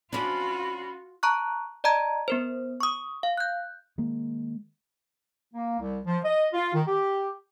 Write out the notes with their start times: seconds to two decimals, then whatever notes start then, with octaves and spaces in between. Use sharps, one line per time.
0.13 C#4 D4 F4 F#4 B5
1.23 A5 A#5 C#6 F#6
1.84 D5 D#5 A5 A#5 G#6
2.28 B3 A#4 C5
2.81 C#6 D#6
3.23 F5
3.37 F#6 G6
3.98 D#3 G#3 A#3
5.54 A#3
5.80 C2
6.06 F3
6.25 D#5
6.53 F4
6.74 D#3
6.87 G4